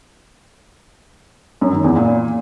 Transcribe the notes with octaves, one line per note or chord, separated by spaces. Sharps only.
F#2
D#3
E2
A#2